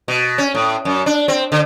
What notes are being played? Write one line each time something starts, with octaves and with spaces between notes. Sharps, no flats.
B2
C#4
A2
F#2
D4
C4
D3